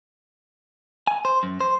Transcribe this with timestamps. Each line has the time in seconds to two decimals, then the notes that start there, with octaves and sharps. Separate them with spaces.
1.07 G#5
1.25 C5
1.43 F#2
1.61 C5